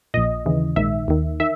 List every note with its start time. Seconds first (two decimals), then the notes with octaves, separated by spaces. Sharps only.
0.14 A#1 A#2 D#5
0.46 D#2 C#3 E3
0.76 A#1 G#2 D#3 E5
1.08 D#2 D#3
1.40 D#3 E5